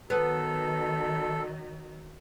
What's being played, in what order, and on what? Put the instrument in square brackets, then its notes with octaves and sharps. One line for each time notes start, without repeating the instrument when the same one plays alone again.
[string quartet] D#3 F#3 [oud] B3 [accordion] A4